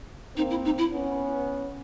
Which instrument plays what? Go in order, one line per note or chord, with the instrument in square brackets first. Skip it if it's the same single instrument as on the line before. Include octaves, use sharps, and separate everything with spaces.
[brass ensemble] A#3 C4 [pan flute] D#4
[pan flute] E4
D#4
E4
[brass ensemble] B3 C#4